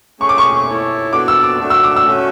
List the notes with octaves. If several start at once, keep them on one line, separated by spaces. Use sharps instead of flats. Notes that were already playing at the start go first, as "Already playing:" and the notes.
A3 C#4 G#4 C#6
D6
C#6
E4 A4 C#5
B3 D4 F#4 A4 D5 D6
E6
D6
A3 D4 F#4
E6
D6
E6
A3 C#4 F#4